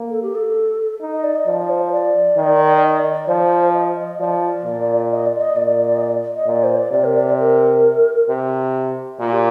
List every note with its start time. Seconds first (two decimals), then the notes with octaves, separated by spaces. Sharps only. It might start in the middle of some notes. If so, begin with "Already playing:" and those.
Already playing: A#3
0.10 A4
0.22 G4
0.35 A4
1.01 D#4
1.12 D#5
1.23 D5
1.35 D#5
1.47 F3 D5
1.60 D5
1.69 C5
1.92 D5
2.37 D#3
2.82 D#5
2.99 D5
3.13 D5
3.28 F3 C5
3.74 D#5
4.01 D#5
4.19 F3 D5
4.64 A#2
5.11 D#5
5.26 D5
5.41 D#5
5.56 A#2 D5
5.96 D#5
6.01 D5
6.35 D#5
6.47 A#2 D5
6.63 C5
6.77 D5
6.92 C3 D5
7.04 A#4
7.15 D5
7.27 D5
7.38 A#4
8.29 C3
9.20 A#2 F4
9.32 G4